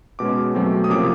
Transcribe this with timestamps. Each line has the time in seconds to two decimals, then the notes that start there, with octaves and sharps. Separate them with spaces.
0.19 B2 G#3 C#4 D6
0.55 B2 F#3 A3 C4
0.84 D#6
0.90 C3 F3 A#3 C#4 D6